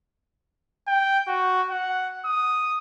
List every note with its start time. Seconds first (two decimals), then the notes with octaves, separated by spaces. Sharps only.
0.88 G5
1.28 F#4
1.70 F#5
2.25 D#6